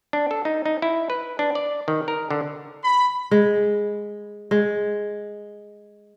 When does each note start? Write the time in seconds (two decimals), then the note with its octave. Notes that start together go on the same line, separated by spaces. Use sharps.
0.13 D4
0.31 A4
0.45 D#4
0.66 D#4
0.82 E4
1.10 B4
1.39 D4
1.55 D5
1.88 D#3
2.08 A#4
2.31 D3
2.84 B5
3.31 G#3
4.51 G#3